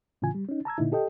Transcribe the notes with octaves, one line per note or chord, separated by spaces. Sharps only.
A2 C#3 E3 F4 G#5
G3
C#4 D#4
A5 A#5 E6 G#6
A#2 D3 D#4 E4
G4 A4 D#5 G5